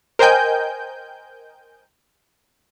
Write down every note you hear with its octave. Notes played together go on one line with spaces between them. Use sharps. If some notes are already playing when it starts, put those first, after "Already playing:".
A#4 C5 D#5 G5 G#5 G6